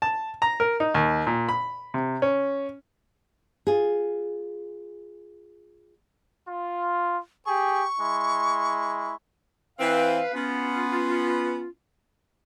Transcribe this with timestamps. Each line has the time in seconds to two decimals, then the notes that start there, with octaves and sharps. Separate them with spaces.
0.02 A5
0.42 A#5
0.60 A#4
0.80 D#4
0.95 D#2
1.27 A#2
1.49 B5
1.94 C3
2.22 C#4
3.67 F4 G#4
6.48 F4
7.46 G4 G#4 C#6
8.00 G#3 E4
9.79 E3 C4 B4 F5
10.34 B3 C#4 F4